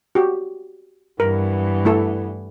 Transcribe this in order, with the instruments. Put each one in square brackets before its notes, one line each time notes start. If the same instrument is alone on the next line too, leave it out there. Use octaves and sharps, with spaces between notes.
[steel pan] F#4 G4
[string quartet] G2 E3 B3 [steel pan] A#4
[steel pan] A3 E4 A4